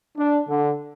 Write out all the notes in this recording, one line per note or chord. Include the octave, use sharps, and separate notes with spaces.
D4
D3